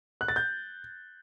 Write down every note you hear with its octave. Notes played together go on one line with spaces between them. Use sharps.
F#6
A6
G6